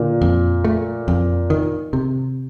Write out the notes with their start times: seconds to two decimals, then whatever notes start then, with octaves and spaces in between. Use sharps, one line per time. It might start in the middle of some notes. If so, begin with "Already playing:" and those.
Already playing: A#2 D3
0.22 F2
0.65 A3
1.08 F2
1.50 D#3
1.93 C3